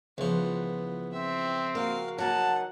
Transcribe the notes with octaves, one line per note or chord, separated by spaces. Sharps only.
C#2 E3 F3 B3
C4 E5
A#3 F#4 F5
F#3 A#3 D#4 F#5 A5